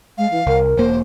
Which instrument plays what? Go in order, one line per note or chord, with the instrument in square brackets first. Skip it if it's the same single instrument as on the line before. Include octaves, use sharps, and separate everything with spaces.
[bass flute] G#3 [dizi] F5
[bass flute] E3
[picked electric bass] C2 [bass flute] A#4
[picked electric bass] E1 A#3 [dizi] C5